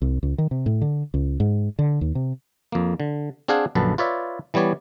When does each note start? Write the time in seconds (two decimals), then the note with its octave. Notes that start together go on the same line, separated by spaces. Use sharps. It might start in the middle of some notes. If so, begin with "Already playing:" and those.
0.02 C2
0.23 C#2
0.38 D#3
0.51 C3
0.66 A2
0.82 D3
1.14 C#2
1.40 G#2
1.79 D3
2.01 D#2
2.15 C3
2.72 F2 A#3
3.00 D3
3.48 C4 D4 G#4 F5 F#5 G#5
3.75 A#1 F#2 D3 B4 A5
3.98 F4 B4 C#5 D5 E5
4.54 E3 G3 B3 C#5 D5